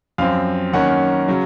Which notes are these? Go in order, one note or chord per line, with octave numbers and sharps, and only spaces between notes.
F#2 F3 C4 F5
F#2 D#3 A#3 C#4 F#5
C#3 F#3